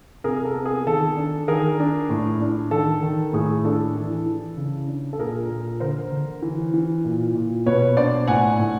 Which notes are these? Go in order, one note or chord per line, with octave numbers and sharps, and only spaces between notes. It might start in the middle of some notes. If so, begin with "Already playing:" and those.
C3 G#4 A#4
A4
B3
G#4
D#3 A4
D4
D#3 G#4 A#4
D4
A2
D4
D#3 A4
D#3
A2 G#4
D4 A4
E3
E3
C#3
D4
A4
A#2 G#4 A#4
A#2
D3 A#4 C5
D3
E3
E3
A#2
A#2
B2 B4 C#5
D4 C5 D5
A2 F#5 G#5
A2